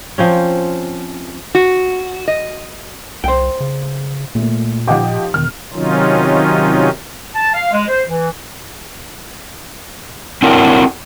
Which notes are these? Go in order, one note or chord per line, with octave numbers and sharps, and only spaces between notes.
F3 C4 C#4
F#4
D#5
C2 C5 G5
C#3
A#2 A3 A#3
F3 D#4 G4 F#5 D6
E1 D#3 F6
C3 D#3 F#3 C#4 D#4 F4
A5
F5
G#3
C5
E3
C4 D4 E4 F#4 A#4 C#5